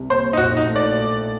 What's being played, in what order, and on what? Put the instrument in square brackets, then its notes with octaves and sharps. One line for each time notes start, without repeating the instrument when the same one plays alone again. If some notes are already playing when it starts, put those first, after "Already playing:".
Already playing: [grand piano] C2 C3 G3
[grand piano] A#3 [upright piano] C5
[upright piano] D#4
[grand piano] A#1 [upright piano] F#4
[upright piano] D#4
[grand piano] A3
[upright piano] D5
[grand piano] A3